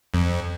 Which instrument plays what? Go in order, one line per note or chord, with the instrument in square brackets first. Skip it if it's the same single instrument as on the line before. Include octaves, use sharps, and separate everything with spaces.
[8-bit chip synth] F2